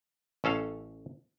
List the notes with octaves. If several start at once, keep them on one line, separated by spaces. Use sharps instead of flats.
A1 C#4 A4 F5